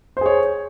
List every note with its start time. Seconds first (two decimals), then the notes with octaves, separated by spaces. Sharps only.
0.17 C5
0.21 G#4
0.26 C#5